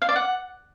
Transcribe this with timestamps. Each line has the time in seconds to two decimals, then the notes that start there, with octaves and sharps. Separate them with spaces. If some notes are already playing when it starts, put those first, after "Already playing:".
0.02 F5
0.09 D5
0.16 F#5